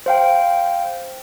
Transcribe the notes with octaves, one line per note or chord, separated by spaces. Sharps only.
C5 F5 G5